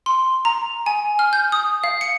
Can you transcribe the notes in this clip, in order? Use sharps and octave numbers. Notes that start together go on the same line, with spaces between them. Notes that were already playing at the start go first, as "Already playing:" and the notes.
C6
A#5
G#5
F6
G6
D#6
F5
C#7